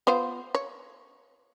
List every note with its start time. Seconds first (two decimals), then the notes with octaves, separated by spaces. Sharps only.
0.07 B3 F4 C5
0.55 C#5